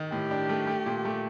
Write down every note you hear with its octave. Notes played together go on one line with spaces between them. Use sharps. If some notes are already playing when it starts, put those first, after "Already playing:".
Already playing: D#3
A2 G4
D4
A3
A3
A#2
A3